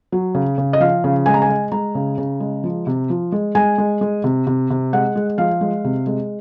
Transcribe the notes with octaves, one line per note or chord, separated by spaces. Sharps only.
F#3
C#3
C#3
D#5
F3 F5
C#3
G#3 G#5
A#5
G#5
G#3
G#3 A#5
C#3
C#3
G#3
F3
C3
F3
G#3
G#3 G#5
G#3
G#3
C3
C3
C3
G#3 F#5
G#3
F3 F5
G#3
C3
G#3